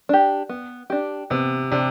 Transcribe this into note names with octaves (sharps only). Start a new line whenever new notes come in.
D4 G4
B3
D4 G4
C3 B3
C3 D4 G4